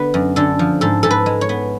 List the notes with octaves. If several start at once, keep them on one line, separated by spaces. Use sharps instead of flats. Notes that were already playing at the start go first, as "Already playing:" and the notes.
Already playing: D3 B3 B4
F#2
D3 A4
F3
G#2 A4
G#2 A4
B4
G#3
C#5
B3